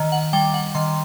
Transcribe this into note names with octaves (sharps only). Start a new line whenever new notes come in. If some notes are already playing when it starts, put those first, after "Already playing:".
Already playing: D#3
F#5
G3 G5
F#5
D#3 C6